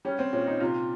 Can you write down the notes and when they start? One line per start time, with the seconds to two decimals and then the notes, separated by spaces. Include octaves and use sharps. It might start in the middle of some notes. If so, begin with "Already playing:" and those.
0.05 G3 C#4
0.19 C4
0.33 A#2 C#4
0.46 D#4
0.60 C3 F4